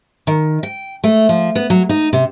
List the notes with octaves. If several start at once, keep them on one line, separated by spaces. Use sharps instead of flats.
D#3
G5
A3
F3
B3
F#3
D#4
C3